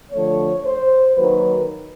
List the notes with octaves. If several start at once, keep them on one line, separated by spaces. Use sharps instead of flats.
D3 F3 A3 C#5
C5
D#3 F#3 A#3 B4